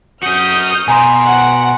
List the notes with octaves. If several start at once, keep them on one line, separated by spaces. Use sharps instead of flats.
C#4 F#4 D#6 F6 G6
B2 G#5 A#5 C6
F#5